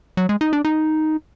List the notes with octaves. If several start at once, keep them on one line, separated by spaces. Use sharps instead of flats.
F#3
G#3
D#4
D4
D#4